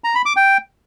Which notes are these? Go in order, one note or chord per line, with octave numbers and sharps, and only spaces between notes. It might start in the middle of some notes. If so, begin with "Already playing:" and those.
A#5
B5
D6
G5